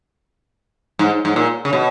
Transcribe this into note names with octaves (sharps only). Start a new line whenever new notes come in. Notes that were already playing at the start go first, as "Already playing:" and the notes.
G#2
G#2
A#2
C#3
B2